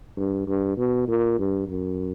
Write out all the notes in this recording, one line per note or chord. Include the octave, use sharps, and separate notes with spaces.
G2
G2
B2
A#2
G2
F#2